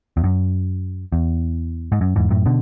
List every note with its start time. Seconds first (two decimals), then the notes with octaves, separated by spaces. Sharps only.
0.17 E2
0.24 F#2
1.12 E2
1.92 G#2
2.01 F#2
2.16 E2 G#2
2.30 F#2 A2
2.46 B2 D3